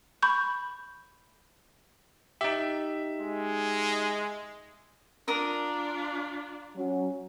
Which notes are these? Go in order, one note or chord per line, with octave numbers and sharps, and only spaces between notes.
B5 C#6 G6
D#4 G4 E5
G#3
D4 F4 A#4 A#5 D#6
F#3 C#4